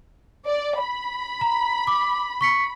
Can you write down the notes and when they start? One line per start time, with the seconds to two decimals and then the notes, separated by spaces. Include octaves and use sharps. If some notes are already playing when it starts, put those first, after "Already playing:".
0.47 D5
0.80 B5
1.41 A#5
1.87 D6
2.41 C#6 B6 C#7